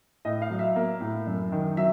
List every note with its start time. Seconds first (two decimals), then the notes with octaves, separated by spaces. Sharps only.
0.25 A2 D#5
0.42 F5
0.50 F#3
0.59 E5
0.76 A#3
1.01 A2
1.27 F#2
1.52 D#3
1.77 F#3 E5